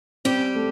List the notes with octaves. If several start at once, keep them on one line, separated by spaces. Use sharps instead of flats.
G3 C4 G4
A3